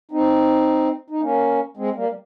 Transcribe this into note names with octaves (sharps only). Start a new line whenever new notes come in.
C4 D#4
D#4
A#3 C#4
G#3 C4
G3 A#3
G3